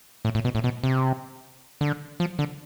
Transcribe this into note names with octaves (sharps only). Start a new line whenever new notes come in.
A2
A2
B2
A2
B2
C3
D3
F3
D3